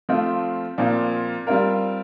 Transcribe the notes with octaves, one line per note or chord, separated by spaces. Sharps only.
F3 A3 C4 F4
A#2 F3 C4
G3 C4 F4 A#4